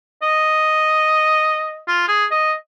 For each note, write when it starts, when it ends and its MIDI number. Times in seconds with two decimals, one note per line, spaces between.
0.22 1.81 75
1.88 2.04 65
2.08 2.25 68
2.31 2.53 75